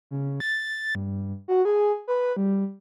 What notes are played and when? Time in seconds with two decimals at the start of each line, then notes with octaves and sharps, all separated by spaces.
0.11 C#3
0.40 A6
0.95 G2
1.48 F#4
1.65 G#4
2.08 B4
2.37 G3